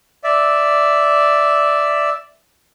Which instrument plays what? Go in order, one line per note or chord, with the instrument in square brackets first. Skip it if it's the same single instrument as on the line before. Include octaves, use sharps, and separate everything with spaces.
[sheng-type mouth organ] D5 E5